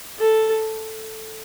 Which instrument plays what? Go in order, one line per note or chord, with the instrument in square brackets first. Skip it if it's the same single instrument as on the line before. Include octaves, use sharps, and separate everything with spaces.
[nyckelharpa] A4